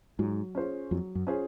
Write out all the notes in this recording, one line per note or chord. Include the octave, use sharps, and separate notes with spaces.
G#2 F#3
C#4 F4 G#4 C5
F2 F#3
F#2
C#4 F4 G#4 C5